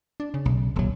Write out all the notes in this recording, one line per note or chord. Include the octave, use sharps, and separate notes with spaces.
D4
C#3
B1
D#1 C2 F#3